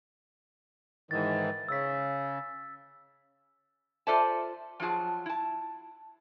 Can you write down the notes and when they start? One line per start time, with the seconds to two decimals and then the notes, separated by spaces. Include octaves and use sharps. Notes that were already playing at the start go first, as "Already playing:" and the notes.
1.11 G#2 D#3 E3 A6
1.69 C#3 E6 B6
4.07 F4 A4 C5 D5 E5 A5
4.80 F3 F#3 F4 G#4 A5
5.26 E4 A5